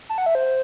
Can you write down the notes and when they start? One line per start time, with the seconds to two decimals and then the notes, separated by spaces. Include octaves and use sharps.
0.09 A5
0.18 F#5
0.26 E5
0.35 C5